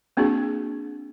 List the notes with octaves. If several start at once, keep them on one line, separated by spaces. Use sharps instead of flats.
A#3 C4 D4 F#4 G#4